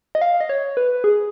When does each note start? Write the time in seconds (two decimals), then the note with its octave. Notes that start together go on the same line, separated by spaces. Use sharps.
0.15 D#5
0.22 F5
0.41 D#5
0.49 C#5
0.77 B4
1.04 G#4